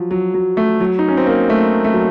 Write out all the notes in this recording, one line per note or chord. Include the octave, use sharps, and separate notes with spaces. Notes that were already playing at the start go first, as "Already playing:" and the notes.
Already playing: F3 F#3
F#3
F#3
A3
F#3
D#4
C#4
C4
A#3
A3
A3
F#3